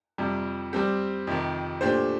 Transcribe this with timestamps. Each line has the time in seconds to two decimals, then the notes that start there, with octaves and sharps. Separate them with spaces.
0.18 F2 C3 G3
0.73 G3 C4 G4
1.27 F2 C3 D#3
1.81 A#2 A3 D4 G4 C5